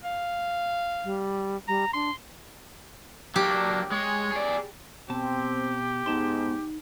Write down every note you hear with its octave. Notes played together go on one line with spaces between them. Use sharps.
F5
G3
G3 A#5
D4 C6
F#3 A#3 D4 G4
G#3 C#5
G#4 D5
B2 C4 G4 A5
G#2 B3 D#4 A5 C6